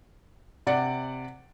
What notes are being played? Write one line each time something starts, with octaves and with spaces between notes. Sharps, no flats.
C3 D5 F#5